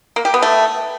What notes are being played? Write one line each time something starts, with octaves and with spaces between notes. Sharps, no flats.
A#3
G4
B3
A3